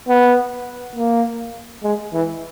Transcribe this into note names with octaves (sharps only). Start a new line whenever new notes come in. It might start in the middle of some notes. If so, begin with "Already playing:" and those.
B3
A#3
G#3
E3